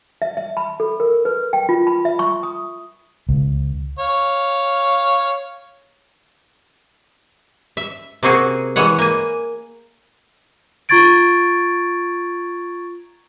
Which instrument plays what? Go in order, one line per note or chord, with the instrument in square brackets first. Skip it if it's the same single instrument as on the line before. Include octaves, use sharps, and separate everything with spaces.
[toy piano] E5
E5
B5
A4
A#4
B4
G5
F4
B5
E5
C#6
D#6
[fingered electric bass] C#2
[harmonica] C#5 F5
[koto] E5
C3 A#3 C4 F#4 G#4
E3 G#3 C#5 F#5
A#3 G#5
[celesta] F4 A#5 C#6 G#6 A6 D7